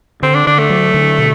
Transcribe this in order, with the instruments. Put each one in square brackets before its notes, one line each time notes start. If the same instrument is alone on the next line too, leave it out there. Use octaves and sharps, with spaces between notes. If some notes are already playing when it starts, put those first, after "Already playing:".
[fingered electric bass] D3 [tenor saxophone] C4
[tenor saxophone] D4
[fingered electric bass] D3 [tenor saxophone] D4
[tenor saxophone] A3
[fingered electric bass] F#3
D3
B2